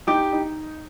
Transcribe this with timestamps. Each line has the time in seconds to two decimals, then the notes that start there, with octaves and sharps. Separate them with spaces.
0.07 D#4 G4
0.33 D#4